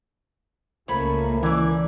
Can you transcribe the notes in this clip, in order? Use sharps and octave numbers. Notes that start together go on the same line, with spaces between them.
C#2 F3 A3 A#3 C#4 C#5 B5
D3 E3 C#4 D5 G#5 D6